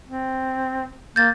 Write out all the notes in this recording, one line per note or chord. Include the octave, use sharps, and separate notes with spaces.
C4
A#3 G6 A6